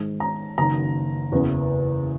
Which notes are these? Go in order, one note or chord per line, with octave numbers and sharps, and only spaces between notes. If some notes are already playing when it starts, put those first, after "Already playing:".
Already playing: G#2 D#3 G#3
A#5
F#1 F#2 D#3 A#5
F#1 E2 C#3 E3 B3